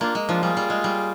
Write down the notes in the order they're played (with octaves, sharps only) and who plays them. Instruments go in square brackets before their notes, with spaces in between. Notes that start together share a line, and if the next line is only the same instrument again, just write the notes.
[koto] A#3 [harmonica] D4 F4
[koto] G#3
[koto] F3 [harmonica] D4 F4
[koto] G3 [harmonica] F4 G#4
[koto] G3
G#3
G3